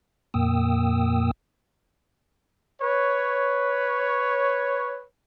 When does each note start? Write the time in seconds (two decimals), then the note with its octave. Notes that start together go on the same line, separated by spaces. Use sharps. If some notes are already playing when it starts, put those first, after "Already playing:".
0.34 F2 A#2 A#3 G5 D#6 E6
2.81 B4 C#5